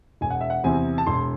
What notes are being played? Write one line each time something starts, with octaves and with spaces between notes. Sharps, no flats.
E1 G#5
F#5
E5
F#5
E2 C3 E3 C4 G#5
A5
E1 C6